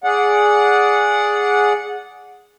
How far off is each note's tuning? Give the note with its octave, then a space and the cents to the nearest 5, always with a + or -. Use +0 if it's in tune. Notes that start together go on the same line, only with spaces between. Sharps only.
G#4 +0 D5 -15 F#5 -15